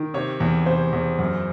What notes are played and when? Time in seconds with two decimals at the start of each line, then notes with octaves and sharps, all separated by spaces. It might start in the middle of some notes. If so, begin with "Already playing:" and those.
Already playing: D#3
0.14 C3 C#5
0.40 E2
0.66 C3 C5
0.93 E2
1.19 F#2